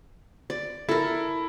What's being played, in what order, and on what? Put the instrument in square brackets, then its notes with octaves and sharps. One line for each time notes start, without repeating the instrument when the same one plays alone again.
[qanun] D5
[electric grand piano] E4 [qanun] A4 A#4